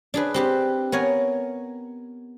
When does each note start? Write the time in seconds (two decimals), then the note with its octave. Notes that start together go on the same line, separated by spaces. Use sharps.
0.14 D4 G#4 B4
0.34 C4 G4 B4
0.92 B3 A#4 C#5 G#5